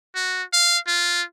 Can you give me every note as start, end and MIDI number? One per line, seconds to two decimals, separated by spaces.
0.15 0.43 66
0.53 0.78 77
0.87 1.23 65